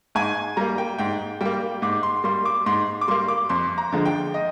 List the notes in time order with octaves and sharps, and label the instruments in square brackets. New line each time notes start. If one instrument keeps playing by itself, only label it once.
[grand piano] G#2 G#5
G3 A#3 A#5
G5
G#2 G5
G3 A#3 G5
G#2 D6
C6
G3 A#3 C6
D6
G#2 C6
D6
G3 A#3 C6
D6
F2 C6
A#5
D3 F3 G#3
G5
D#5